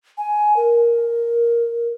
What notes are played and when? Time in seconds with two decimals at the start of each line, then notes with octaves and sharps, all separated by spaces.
0.18 G#5
0.57 A#4